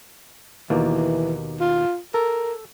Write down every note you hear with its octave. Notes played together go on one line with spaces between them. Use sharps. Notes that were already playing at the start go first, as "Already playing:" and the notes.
D#2 B2 E3 A#3
F4
A4 A#4